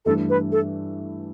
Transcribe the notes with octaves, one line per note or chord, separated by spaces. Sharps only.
G2 E3 A3 D4 A4
B4
A4